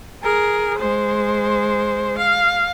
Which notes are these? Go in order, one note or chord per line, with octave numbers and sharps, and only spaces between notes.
G#4 A#4
G#3 C5
F5